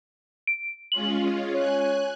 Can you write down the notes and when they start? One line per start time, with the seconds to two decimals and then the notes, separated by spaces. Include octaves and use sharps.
0.47 D7
0.92 G#3 C#4 F4 F#7
1.54 C#5 G#5 F#6